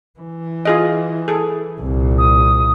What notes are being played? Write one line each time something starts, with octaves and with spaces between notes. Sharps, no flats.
E3
F4 G#4 D#5
G#4 A4
C2 A#2
D#6